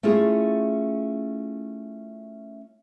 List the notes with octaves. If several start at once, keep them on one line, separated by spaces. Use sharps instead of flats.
A3 C#4 E4 F4 G#4